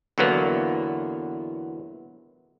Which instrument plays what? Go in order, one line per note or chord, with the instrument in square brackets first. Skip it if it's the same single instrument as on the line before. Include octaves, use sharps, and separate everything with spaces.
[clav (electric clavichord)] E2 D3 E3 F#3 A#3 B3